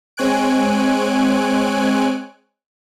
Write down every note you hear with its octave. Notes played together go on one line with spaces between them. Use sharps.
G#3 C4 C#5 G#5 F#6 D7